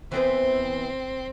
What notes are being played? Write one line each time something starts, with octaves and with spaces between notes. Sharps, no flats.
E3 B3 C4 C5